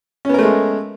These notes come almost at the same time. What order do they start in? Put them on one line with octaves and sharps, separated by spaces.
C#4 B3 A#4 A3 G#3